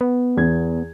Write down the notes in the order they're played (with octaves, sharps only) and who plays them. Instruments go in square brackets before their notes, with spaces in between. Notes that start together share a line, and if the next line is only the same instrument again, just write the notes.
[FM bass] B3
[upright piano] E2 G#6